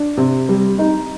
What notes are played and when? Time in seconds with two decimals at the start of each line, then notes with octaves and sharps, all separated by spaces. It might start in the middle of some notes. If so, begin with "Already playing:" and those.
Already playing: D4
0.17 C3
0.49 G3
0.79 D#4